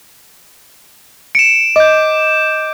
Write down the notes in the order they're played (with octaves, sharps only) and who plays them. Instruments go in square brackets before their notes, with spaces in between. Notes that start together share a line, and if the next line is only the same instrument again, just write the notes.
[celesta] C#7 [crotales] D7 E7
[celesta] D#5 [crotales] D6 G6